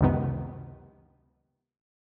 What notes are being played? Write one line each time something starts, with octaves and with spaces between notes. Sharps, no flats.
C#2 F#2 C3 D#3 B3